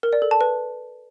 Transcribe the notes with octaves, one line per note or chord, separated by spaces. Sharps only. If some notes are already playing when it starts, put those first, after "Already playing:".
A#4
D5
A4
A5
B4